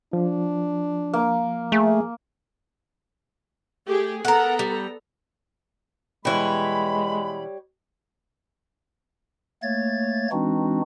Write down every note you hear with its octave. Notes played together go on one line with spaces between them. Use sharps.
F3 D4
A#3
A3 G#4
A3 G4 G#4
B3 A4 A#4 F#5 A#5
G3
B2 E3 G3 G#3 C#5 B5
A3 A#3 C#5 G#6 A6
E3 G#3 C4 D4 D#4 F#4